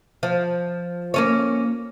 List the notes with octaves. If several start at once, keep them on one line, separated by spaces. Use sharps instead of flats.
F3
A#3 C#4 C#5